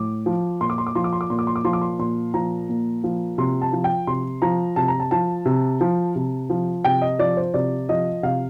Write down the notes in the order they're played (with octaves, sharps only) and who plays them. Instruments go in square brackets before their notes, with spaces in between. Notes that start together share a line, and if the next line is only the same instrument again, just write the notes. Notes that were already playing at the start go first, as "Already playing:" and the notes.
Already playing: [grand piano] A2 D6
F3
A#2 C6
D6
C6
D6
F3 C6
D6
C6
D6
A#2 C6
D6
C6
D6
F3 C6
D6
C6
A#2 C6
F3 A#5
A#2
F3
C3 C6
A5
F3
G5
C3 C6
F3 A#5
C3 A5
A#5
A5
F3 A5
C3
F3
C3
F3
C3 G5
D#5
F3 D5
C5
C3 D5
F3 D#5
C3 F5